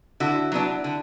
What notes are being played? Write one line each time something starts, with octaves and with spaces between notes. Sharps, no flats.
D3 E4 F#4
F#3 B3 D4
D3